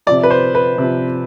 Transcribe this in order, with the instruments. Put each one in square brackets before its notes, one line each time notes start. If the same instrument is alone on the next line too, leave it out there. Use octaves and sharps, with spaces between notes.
[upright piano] F3 D5
C3
B4
C5
B4
C3 F3